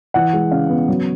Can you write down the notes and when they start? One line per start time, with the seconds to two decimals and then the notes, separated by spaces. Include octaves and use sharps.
0.14 E3 F#5
0.33 G#3
0.51 C#3 F5
0.69 B3
0.89 F#3